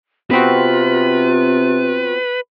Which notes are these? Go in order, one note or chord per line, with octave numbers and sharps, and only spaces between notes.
C3 B3 C4 F4 F#4 B4